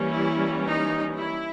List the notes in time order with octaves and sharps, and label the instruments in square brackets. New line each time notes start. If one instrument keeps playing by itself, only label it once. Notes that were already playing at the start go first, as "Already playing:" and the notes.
Already playing: [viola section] E3 G3 A#3 C#4
E4
D#4
E4